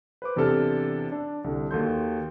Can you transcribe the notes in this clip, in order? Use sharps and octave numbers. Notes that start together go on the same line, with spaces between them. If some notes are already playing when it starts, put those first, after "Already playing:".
B4 C5 D6
E2 C3 D4 A4 A5 F6
D4
C2 D3
D#2 F#4 A4 C6 G6